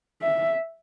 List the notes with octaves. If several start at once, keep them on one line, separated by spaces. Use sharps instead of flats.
E5